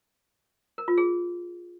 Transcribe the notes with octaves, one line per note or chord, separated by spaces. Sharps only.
A#4
F4
G#4